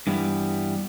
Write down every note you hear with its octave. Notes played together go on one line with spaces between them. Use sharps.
G2 E3 G3 B3